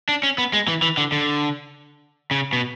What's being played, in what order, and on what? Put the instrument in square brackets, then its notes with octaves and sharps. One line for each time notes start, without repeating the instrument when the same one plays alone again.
[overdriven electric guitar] D4
C#4
B3
G#3
E3
E3
D3
D3
C#3
B2